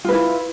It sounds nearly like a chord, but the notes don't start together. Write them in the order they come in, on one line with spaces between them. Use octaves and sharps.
F4 B4 E4